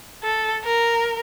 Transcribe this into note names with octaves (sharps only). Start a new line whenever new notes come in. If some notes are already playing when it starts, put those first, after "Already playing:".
A4
A#4